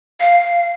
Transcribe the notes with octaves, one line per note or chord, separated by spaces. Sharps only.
F5